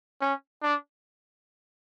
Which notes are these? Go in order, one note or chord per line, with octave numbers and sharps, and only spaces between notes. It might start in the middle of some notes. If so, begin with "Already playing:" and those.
C#4
D4